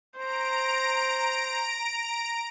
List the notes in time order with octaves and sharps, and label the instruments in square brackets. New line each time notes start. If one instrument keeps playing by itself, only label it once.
[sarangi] C5 [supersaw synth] A#5 D7